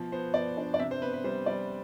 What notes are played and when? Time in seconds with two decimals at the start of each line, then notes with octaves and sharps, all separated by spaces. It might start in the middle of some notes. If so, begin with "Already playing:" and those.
Already playing: B2 F3
0.12 B3 C5
0.34 B3 D5
0.57 D4
0.74 D5
0.79 C3 E5
0.91 C5
1.02 B3 B4
1.13 B4
1.24 G3 C5
1.46 G3 D5